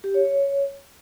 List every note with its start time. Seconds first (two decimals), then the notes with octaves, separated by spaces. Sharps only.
0.04 G4
0.14 C#5
0.25 C#5